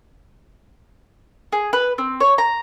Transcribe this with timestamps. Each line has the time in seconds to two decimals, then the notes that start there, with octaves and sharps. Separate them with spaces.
1.52 G#4
1.73 B4
1.98 C4
2.20 C#5
2.38 A#5